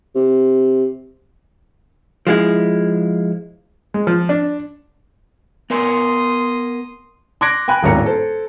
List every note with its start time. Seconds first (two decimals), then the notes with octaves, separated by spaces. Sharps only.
0.15 C3
2.27 F3 G#3 E4
3.94 G#3
4.07 F3
4.29 D4
5.70 B3 A#4 G#5 C6 D#6
7.41 C6 D6 F#6 G#6 A#6 D7
7.68 G5 G#5 B5 F#6
7.83 D#1 G#1 A2 A#5 C#7
8.06 A4 C5